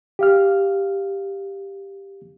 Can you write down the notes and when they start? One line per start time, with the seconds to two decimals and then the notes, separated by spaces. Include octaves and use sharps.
0.19 G4 F5 F6